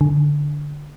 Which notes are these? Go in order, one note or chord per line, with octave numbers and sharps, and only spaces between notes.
D3